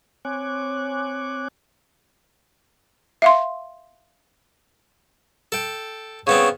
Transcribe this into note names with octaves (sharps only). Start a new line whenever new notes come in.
C4 C#5 G#5 D6 F#6
E5 F5 C6
A4 G5
C#3 B3 C4 C#5